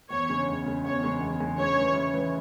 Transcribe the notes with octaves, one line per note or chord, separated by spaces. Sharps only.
E2 C#5
C#3 G#3
E2
C#3 G#3
E2 C#5
C#3 G#3
E2
C#3 G#3
C#3 C#5
G#3
E3
C#3
E3 G#3